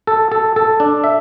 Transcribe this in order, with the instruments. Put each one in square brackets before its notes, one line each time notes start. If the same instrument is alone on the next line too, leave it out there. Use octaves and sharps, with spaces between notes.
[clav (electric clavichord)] A4
A4
A4
D4
E5